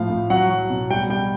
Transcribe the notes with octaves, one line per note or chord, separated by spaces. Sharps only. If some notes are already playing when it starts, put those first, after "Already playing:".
Already playing: A2 F3 F5
A2
F#3 F#5
F#3
B2
G3 G5
G3 G5